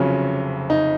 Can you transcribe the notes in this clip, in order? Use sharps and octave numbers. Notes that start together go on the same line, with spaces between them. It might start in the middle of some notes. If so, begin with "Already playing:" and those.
Already playing: F1 F2 C#3 F#3 C#4
D#4